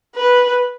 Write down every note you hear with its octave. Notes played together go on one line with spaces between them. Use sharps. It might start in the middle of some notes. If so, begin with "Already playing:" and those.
B4